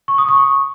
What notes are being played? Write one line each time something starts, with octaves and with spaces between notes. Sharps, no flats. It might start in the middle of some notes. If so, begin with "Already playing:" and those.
C#6
D#6
C#6